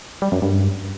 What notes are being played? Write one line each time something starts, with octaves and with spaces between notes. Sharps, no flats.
G3
F#2
G2